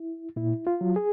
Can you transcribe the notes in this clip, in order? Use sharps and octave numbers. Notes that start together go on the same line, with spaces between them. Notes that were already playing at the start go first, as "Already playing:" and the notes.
Already playing: E4
A#2 E4
F4
F#3
G#4